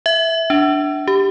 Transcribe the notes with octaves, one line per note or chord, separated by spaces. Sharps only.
E5
D4
G4